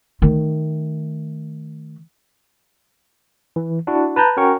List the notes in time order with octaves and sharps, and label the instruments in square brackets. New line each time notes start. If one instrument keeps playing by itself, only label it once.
[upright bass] D#3 A3
[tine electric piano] E3
D4 E4 F#4
B4 A5 A#5 G6
C#4 F#4 A#4 C#5 G5 C#6